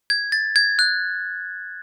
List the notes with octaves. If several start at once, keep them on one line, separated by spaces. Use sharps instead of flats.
G#6
A6
G#6
F#6